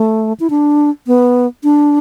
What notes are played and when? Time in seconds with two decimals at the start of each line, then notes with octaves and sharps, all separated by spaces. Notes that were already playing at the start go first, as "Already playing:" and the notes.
Already playing: A3
0.40 E4
0.50 D4
1.07 B3
1.64 D4